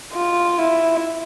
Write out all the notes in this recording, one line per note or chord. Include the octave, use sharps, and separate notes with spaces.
F4
E4